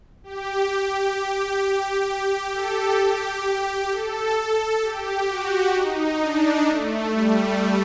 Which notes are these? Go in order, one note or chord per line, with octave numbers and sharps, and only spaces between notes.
G4
G4
A4
G4
A4
G4
F#4
D#4
D4
A3
G3